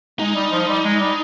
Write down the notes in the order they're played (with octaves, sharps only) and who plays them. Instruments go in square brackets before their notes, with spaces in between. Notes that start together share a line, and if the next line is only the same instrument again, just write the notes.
[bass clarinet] G#3 [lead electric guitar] D#4
[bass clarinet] G3
F3
G3
G#3
G3